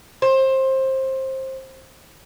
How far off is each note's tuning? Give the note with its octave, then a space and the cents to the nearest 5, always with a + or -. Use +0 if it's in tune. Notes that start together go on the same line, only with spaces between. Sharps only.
C5 +20